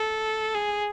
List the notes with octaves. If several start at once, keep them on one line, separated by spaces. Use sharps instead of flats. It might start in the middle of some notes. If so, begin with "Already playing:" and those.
Already playing: A4
G#4